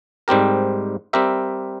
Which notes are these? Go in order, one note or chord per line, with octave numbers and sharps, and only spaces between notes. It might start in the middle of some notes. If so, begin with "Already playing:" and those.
G#2 G3 C4 G4 A#4
G3 C4 G4 A#4 E5